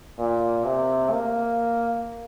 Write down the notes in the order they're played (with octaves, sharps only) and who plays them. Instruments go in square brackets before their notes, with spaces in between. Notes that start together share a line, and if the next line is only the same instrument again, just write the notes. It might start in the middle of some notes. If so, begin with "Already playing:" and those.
[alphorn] A#2
C3
A#3